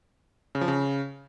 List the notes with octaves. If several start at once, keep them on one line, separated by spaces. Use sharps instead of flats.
C#3
F3
C#3